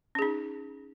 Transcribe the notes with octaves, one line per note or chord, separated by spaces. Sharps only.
C#4 D#4 G#4